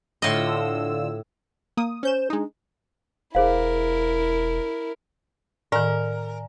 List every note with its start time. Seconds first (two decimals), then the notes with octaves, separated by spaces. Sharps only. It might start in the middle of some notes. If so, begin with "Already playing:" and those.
0.22 A2 D3 F4 D#5 E6
1.77 A#3 D#6
2.03 C#4 C5 G6 E7
2.30 G#3 D4 D#4
3.35 E1 E4 G#4 A#4 C5 F5
5.72 A2 D#3 A#4 D5 G#5 A#5